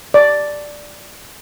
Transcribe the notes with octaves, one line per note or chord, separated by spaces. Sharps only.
D5